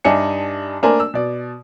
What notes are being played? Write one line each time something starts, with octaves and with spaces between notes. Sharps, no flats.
G2 D4 D#4 E5 G#5 C#7
A3 A#3 D4 A#4 C5 G#5
E6
B2 D5